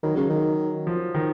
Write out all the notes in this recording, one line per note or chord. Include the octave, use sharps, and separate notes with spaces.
D#3 F#3
C#3
D#3
F3
D#3